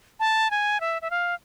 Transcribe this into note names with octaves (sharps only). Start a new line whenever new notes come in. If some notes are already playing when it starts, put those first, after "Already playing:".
A5
G#5
E5
E5
F5